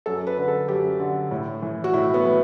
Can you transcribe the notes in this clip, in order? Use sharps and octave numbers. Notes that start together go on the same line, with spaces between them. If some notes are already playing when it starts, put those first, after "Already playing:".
F#2 A4
B4
D3
A4
F#2 G4
D3
A2
E3
F#4
A2 E4
B3
E3